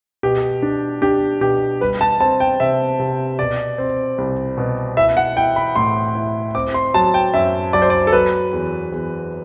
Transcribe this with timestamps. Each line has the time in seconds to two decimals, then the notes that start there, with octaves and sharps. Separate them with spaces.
0.23 B2 G4
0.62 D4
1.02 D4 G4
1.41 B2 G4
1.81 G3 B4
2.01 A5
2.20 C4 A5
2.40 G5
2.60 C3 E5
2.99 C3
3.39 B2 D5
3.78 C4
4.18 C2
4.57 B2
4.97 E4 E5
5.17 F#5
5.36 E4 G5
5.56 B5
5.76 A2 C6
6.15 E4
6.55 C4 D6
6.74 C6
6.94 F#3 A5
7.14 G5
7.34 F#2 E5
7.73 F#3 D5
7.82 C5
7.90 D5
8.07 A4
8.12 F#3 B4
8.52 E2
8.92 E2